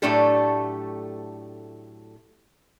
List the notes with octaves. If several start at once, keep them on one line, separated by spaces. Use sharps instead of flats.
A2 F#3 A3 D4 G4 A4